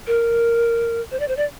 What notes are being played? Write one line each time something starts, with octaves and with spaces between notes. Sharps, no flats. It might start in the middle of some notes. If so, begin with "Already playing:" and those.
A#4
C5
D5
C5
D5